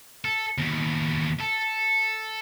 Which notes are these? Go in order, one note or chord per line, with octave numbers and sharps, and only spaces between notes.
A4
D#2 B2
A4